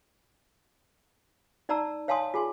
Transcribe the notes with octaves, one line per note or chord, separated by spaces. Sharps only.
D#4 D5 A5 A#5 E6
C#5 F5 G#5 A5 C6 D#6
F4 G#4 G#5 C6